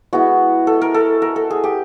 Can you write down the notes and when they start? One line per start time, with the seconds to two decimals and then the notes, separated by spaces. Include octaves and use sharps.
0.13 G#3 B3 E4 F#4
0.67 A4
0.81 A#4
0.94 A4
1.22 A#4
1.36 A4
1.50 G#4
1.64 G4